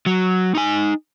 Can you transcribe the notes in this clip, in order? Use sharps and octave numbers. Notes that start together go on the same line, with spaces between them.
F#3
D#4 G#5